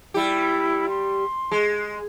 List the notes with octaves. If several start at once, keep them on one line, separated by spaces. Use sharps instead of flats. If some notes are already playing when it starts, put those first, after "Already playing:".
G3 E4 G4
C6
G#3